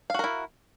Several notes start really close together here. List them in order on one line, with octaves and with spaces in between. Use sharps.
F5 F#4 A#4 E4